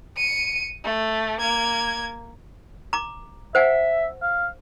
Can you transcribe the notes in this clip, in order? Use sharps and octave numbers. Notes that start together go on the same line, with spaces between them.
C#7 D#7
A3
A#3 G#6
A#5 D6
C5 E5 F#5 G#5
F5